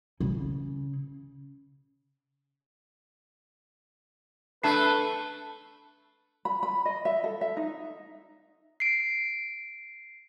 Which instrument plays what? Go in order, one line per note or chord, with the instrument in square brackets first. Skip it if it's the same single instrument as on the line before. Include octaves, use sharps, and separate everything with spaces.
[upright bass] C#3
[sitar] A3 [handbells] D4 A5 C7 [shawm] B4
[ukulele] B5
B5
D#5
E5
A4
E5
D#4
[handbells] C7 D7